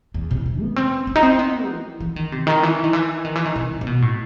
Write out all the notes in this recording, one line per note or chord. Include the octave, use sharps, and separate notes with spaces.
E2
C3
C3
B3
C4
C4
D#4
C4
B3
E3
E3
D#3
C3
D#3
E3
D#3
E3
D#3
E3
D#3
C3
C3
B2
A2